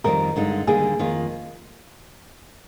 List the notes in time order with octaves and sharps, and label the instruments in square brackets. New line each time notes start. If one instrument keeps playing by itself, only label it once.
[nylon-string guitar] F2 D#3 G3 C4 D#4 [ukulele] A#4
[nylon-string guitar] G2 D3 G#3 D#4
[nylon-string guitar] D#2 D3 G3 A#3 [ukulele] G#4
[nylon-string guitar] F2 D#3 A#3 F4